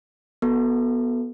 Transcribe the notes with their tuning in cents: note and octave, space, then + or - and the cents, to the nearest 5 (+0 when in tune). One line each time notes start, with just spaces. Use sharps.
B3 -15 F#4 +0 A4 +5